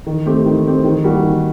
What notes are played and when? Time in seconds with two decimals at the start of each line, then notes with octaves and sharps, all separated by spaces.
0.06 D#3
0.26 A3 C4 G4
0.46 D#3
0.65 A3 C4 G4
0.84 D#3
1.04 G3 A#3 F#4
1.23 D#3